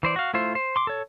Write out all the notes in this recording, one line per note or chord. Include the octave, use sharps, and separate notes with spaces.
E3 C5 D5
F#4 F5
A3 E4 F4 C5
C5
C6 D6
A4 C#5